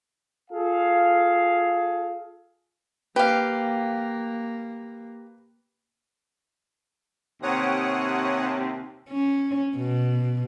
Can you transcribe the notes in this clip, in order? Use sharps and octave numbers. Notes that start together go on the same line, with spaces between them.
F4 G#4 A4 F5
A#3 G4 B4 F5
D#2 C3 C#5 F#5 D#6
C#4
B2